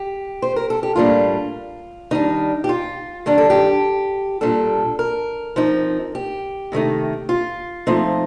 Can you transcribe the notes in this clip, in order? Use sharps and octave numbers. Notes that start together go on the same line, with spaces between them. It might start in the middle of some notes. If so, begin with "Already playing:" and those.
Already playing: G4
C5
A#4
A4
G4
A2 G3 A#3 D4 F4
D#3 G3 D4 D#4
G4
F4
D#3 G3 D4 G4
A4
G4
A#2 G3 D4 A4
A#4
F3 C4 D#4
G4
C3 D#3 A3 D#4
F4
F3 A3 C4 D#4